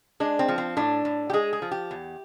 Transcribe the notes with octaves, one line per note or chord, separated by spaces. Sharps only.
G#3 D4
C4
F3
C4
A2 D4
A2
G4
G#3 G#4
G#4
F3
G4
E2